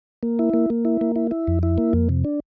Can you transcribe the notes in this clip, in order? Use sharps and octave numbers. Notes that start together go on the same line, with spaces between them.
A#3
E4
A#3
A#3
E4
A#3
E4
E4
F2
E4
A#3
F2
C3
D4